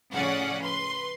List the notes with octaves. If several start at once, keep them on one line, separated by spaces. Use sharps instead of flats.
A2 C#3 F3 C#4 D5 F#5
B4 C6